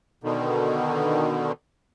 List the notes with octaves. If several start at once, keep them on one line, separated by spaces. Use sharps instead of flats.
B2 D3 D#3